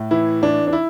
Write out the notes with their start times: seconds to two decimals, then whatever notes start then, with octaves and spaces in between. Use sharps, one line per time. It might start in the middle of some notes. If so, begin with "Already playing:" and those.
Already playing: A2
0.11 E3 E4
0.42 E3 D4
0.67 D4
0.73 E4